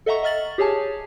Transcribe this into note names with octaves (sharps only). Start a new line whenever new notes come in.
A4 D#5 E5 F#5 A#5 C#6
D#5 E5 F6 A6 F#7
G4 G#4 C#5 G#5 A5